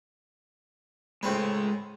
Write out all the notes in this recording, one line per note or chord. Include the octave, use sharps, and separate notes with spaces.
A2 G#3 C4 B4 C#5